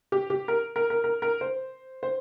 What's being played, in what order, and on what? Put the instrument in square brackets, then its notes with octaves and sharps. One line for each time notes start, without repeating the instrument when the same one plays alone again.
[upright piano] G4
G4
A#4
A#4
A#4
A#4
A#4
C5
C5